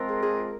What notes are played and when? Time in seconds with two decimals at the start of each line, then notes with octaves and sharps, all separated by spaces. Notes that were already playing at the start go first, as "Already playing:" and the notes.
Already playing: F3 G#3 C4 F4 A#4
0.09 G#4
0.22 G#4